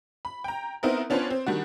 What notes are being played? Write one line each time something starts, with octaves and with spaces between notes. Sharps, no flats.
B5
G5 A#5
B3 C4 D#4 E4 A#4
B3 C#4 D4 F4 B4 C5
C4
D#3 G3 D4 F#4